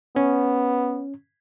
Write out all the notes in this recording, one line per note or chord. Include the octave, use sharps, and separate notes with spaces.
B3 C#4